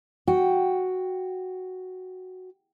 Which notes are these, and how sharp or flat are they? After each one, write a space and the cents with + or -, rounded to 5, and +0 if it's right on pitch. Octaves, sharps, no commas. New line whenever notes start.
F#4 +0 G5 +0